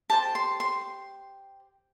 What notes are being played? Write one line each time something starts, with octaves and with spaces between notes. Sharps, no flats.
G4 C5 A5
C6
C6